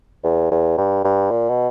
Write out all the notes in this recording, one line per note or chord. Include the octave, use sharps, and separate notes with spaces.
E2
E2
G2
G2
A#2
B2